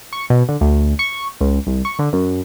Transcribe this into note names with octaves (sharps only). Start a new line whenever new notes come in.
C#6
B2
D3
D2
C#6
C#2
C2
C#6
D3
F#2